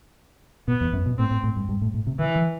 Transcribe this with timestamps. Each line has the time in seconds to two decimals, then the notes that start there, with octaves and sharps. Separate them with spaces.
0.68 B2 B3
0.81 E2
0.93 F#2
1.06 B2
1.18 A2 C4
1.31 A2
1.44 A2
1.56 G2
1.69 G2
1.82 A2
1.94 A2
2.07 C3
2.19 D#3 E3
2.36 E3